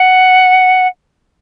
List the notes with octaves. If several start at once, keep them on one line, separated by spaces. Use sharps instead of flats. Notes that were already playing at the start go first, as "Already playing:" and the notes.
Already playing: F#5